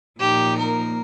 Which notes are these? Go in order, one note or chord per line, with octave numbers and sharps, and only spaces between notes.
A#2 F3 D#4 G4
A#3 A#4